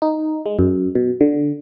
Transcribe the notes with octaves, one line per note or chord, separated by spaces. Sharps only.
D#4
G#3
F#2
B2
D3